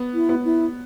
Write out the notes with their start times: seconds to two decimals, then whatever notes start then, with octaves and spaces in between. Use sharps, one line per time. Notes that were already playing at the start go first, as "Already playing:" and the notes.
Already playing: B3
0.14 E4
0.29 B3
0.45 E4